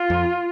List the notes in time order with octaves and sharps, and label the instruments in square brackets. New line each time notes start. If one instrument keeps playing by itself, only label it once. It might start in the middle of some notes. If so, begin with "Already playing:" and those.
Already playing: [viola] F4
[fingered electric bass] F2